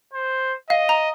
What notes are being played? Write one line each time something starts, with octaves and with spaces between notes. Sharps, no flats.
C5
D#5 F5
A#5